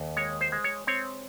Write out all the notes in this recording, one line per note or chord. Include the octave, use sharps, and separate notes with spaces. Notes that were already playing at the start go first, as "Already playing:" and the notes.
Already playing: D#2
G#3 C#5
C5
G#3
C#5
C4 C#5